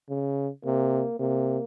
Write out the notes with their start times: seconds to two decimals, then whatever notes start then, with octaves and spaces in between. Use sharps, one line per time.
0.10 C#3
0.64 C3 A#3
1.20 C3 A#3